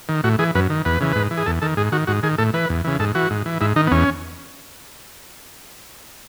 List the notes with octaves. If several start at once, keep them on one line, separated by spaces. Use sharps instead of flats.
D#3
A2 F#4
E3 G#4
F#2 B4
D#3
E2 B4
C#3 E3
G#2 B4
E3
G#4
E2 A4
D#3 A4
G#2 G#4
D#3 F#4
G#2 F#4
D#3 G#4
A2 A4
E3 B4
E2
C#3 E3
G#2 A4
E3 F#4
G#2
E3
G#2 E4
D#3 D#4
B3
E2 C#4